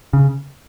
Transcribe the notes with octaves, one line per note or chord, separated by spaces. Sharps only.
C#3